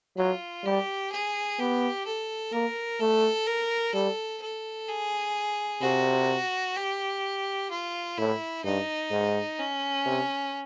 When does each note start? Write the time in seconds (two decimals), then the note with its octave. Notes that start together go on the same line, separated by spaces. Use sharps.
0.17 F#3 F4
0.64 G3 G4
1.12 G#4
1.59 B3 G4
2.06 A4
2.52 A#3 A#4
3.00 A3 A4
3.47 A#4
3.94 G3 A4
4.41 A4
4.88 G#4
5.82 C3 F#4
6.76 G4
7.71 F4
8.18 A2 E4
8.64 G2 D#4
9.11 G#2
9.59 C#4
10.06 C3